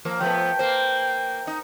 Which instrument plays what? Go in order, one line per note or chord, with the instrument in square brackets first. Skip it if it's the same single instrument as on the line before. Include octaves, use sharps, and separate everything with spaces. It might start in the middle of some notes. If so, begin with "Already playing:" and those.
[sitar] F3 A#3
[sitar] F3 A3 B3 [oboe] G5
[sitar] A#3 C5
D#4